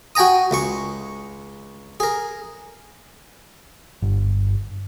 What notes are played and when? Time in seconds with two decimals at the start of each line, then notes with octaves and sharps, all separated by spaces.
0.15 F#4 G5 G#5 A#5 D#6
0.51 C#2 G#3 C#6
2.00 G#4 A#4
4.02 G1